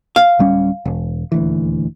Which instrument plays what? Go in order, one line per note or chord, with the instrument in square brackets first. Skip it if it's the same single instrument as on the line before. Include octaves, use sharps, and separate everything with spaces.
[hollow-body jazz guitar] F5
[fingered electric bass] D1 G3 C#4
E1
D#1 D2 E3